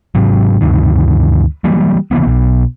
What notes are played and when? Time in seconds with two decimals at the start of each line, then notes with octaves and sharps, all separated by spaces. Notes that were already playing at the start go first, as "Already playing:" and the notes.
0.15 G#2 C3 F#3
0.61 D2 G2 C3 D#3
1.64 E3 F#3 G3 A#3
2.11 C#3 E3 A#3 B3
2.26 B1 B2